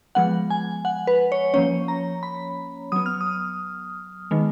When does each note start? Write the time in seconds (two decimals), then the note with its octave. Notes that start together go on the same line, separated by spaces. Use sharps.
0.15 F3 G#3 B3 F#5
0.50 G#5
0.85 F#5
1.07 B4
1.32 C#5
1.54 F3 A#3 C#4 C#5
1.88 A#5
2.23 B5
2.92 F#3 B3 D#6
3.06 F6
3.21 D#6
4.31 D#3 G#3 B3